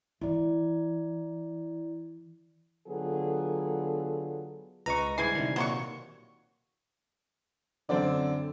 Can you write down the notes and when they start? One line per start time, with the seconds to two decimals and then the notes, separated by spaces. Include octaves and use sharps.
0.21 E3 E4 D5
2.88 D3 F#3 B3 F4 G#4 A4
4.86 C#2 B4 D#5 A#5 C#6
5.18 G#2 D3 E3 G3 G#4 G#6 C7
5.35 C3 D#3
5.56 A#2 F#3 C6 C#6
7.89 F#2 D3 C4 D5